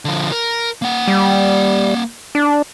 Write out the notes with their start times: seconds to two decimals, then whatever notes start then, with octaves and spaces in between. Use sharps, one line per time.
0.05 D3 F3
0.32 A#4
0.82 A#3 F#5
1.08 G3
2.35 D4